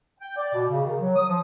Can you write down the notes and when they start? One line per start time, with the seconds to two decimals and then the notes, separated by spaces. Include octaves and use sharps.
0.20 G5
0.37 D5
0.54 B2
0.70 C#3
0.85 D#3
1.00 F#3
1.16 D#6
1.29 F3